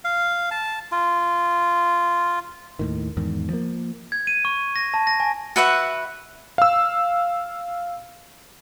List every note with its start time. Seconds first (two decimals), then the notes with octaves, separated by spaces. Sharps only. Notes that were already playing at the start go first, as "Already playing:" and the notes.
0.04 F5
0.51 A5
0.92 F4
2.79 D#2 A2 D#3
3.17 E2 G#2 D#3
3.50 F3 A#3
4.12 G#6
4.27 D#7
4.45 C#6
4.76 A#6
4.94 A5
5.07 A#6
5.20 G#5
5.56 F#4 B4 E5 F#5
6.58 F5 E6